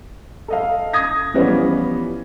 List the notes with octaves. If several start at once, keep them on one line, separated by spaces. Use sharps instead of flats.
A4 D#5 F5
D#6 G#6 A#6
E3 F3 G3 B3 C#4 F4